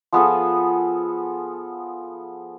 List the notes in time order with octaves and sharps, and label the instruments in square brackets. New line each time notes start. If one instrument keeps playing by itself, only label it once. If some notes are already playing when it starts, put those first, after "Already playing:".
[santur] F3 B3 G#4 A4